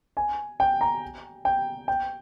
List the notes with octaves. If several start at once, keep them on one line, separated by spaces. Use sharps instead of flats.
G#5
G5
A#5
G5
G5